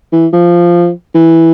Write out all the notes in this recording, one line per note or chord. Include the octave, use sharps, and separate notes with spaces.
E3
F3
E3